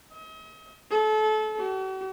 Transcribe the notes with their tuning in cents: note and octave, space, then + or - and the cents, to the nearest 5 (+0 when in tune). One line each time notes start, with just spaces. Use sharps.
D#5 +40
A4 -30
F#4 +45